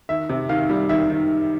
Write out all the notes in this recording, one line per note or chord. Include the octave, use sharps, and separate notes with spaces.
D#3 E5
C3
D#3 F5
G3
D#3 E5
D#3